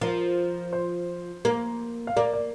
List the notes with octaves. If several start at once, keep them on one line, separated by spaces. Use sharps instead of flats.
F3 A#4
C5
A#3
F5
A#3 D5
D5